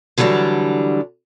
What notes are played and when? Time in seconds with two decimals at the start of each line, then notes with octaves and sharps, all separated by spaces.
0.18 D3 E3 F#3 G3 D4